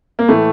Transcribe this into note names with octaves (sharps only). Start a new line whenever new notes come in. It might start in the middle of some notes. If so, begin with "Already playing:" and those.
A#3
A2 E3 A3